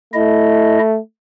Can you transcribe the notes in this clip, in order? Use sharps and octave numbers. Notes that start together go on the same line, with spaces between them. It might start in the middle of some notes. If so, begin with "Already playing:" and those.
A3 E4 D#5